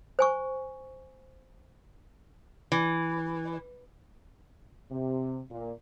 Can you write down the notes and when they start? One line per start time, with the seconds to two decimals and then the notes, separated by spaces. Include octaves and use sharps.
0.19 C5 G#5 C#6
2.72 E3
4.91 C3
5.50 A#2